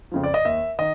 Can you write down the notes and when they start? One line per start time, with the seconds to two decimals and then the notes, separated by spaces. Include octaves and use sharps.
0.12 F2 C#3 F3
0.24 D5
0.34 D#5
0.45 D#2 E5
0.79 D#3 D#5